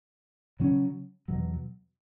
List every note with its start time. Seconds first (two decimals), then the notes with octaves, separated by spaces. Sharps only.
0.60 C#3 F#3 C#4
1.28 E2 B2 F#3